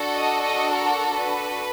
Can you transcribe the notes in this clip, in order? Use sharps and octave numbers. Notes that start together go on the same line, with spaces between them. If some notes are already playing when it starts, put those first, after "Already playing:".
Already playing: D4 F#4 A4
D#5
D#5
A#4
B4